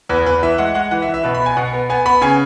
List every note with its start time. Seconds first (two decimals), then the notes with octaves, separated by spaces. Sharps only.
0.09 E2 B4
0.26 E2 B4
0.43 E3 E5
0.58 G#3 F#5
0.75 G#3 F#5
0.91 E3 F#5
1.02 E5
1.08 E3
1.14 E5
1.24 B2 B4
1.35 B5
1.40 B3
1.46 G#5
1.57 B2 F#5
1.73 B3
1.90 B3 G#5
2.06 B3 B5
2.22 C#3 G#5